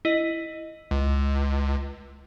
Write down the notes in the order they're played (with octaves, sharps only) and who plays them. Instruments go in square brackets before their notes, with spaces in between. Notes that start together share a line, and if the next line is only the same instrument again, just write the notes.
[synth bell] E4 D#5
[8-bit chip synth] C#2